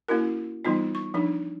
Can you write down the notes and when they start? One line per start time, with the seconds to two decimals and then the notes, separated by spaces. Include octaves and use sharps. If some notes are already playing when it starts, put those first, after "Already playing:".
0.09 A#3 C#4 E4 F#4 A#4
0.65 E3 G3 B3 D#4 F4
0.95 C#6
1.14 F3 D4 D#4